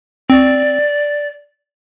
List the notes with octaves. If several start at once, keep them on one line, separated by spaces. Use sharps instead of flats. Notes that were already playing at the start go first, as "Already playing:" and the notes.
C4 D5